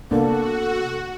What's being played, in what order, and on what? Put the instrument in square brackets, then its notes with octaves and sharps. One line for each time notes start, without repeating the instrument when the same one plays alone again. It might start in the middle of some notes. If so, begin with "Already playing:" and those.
[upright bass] C3 [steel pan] A#3 B3 D4 [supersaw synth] F#4 [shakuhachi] A4